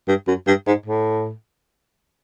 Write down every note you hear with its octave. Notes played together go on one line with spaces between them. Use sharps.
G2
F#2
G2
G#2
A2